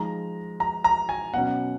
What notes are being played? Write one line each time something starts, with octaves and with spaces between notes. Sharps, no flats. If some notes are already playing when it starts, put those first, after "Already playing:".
Already playing: F3 G#3 D#4 A#5
A#5
A#5
G#5
B2 F#3 C#4 F#5